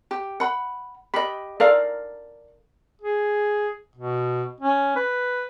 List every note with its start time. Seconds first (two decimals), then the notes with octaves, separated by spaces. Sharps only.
0.11 G4
0.40 F#5 B5
1.14 G4 D#5 B5
1.60 A4 A#4 D5 F5
3.02 G#4
3.96 B2
4.61 C#4
4.96 B4